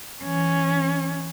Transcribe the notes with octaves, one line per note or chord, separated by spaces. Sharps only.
E3 C#4